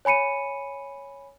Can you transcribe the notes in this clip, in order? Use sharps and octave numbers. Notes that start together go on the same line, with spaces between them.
C#5 G#5 B5 C#7 D#7